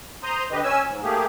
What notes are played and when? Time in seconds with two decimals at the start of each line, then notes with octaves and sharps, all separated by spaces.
0.23 C5 A#5 C6 D#6
0.51 D3 G4 B4 D#5
0.63 C#4 G#5 E6
0.87 G#2
1.03 A3 A#3 G4 G#4